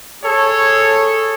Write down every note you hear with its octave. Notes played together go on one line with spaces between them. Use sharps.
G#4 A4 C#5